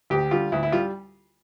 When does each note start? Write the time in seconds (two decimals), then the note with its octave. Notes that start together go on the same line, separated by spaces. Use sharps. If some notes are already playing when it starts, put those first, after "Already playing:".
0.10 D2 G4
0.31 D3 G3 F4
0.52 D2 E4
0.63 E4
0.72 G3 F4